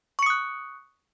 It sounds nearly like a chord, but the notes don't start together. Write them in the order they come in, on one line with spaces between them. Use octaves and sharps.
C#6 C#7 D#6 F#6